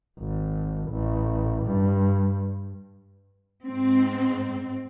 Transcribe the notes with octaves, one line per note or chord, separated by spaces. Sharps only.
G#1
A1
G2
G#2 C4